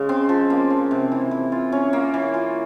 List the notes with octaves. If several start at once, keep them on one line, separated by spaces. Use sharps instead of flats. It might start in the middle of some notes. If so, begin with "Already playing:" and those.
Already playing: C#3 G#3
C4
F3
A#3
F3
C3
E3
E3
F4
C#4
A#3
E3
F4